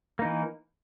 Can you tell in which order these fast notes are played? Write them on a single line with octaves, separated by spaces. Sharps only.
A#3 D#4 E3